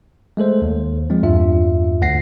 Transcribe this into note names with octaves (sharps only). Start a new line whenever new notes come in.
G#3 A3 A4 C5
D#2
F3 G#3 C4
E2 G2 F4 E5
D2 F#5 A#6 C7